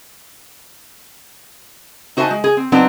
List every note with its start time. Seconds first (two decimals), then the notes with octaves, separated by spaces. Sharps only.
2.17 D#4 F#4 C5 E5 G#5 A5
2.31 G#3
2.44 G#4
2.57 C4
2.72 F#3 B3 C4 D4 D#4